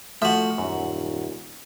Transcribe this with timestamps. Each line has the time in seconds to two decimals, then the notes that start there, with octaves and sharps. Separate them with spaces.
0.22 F3 A3 F#4 E5
0.58 D#1 F#2